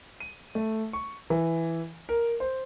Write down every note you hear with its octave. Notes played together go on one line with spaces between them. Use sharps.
D#7
A3
C#6
E3
A#4
C5